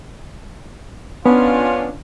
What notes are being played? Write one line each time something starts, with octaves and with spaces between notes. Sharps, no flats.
B3 C#4 D4 F4